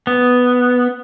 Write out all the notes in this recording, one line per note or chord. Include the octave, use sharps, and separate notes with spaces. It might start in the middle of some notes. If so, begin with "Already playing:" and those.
B3